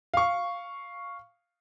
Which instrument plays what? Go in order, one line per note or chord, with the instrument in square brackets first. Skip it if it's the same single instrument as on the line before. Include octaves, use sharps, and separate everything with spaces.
[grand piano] F5 C#6